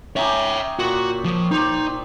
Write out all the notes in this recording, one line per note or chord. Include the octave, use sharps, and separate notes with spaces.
C#4 D#4 G4 C#5 E5
A#2 F#4 C#6
F3
D#4 C5 D5